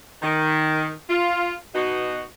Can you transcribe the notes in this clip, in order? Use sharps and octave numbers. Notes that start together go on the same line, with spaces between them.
D#3
F4
B2 D#4 F#4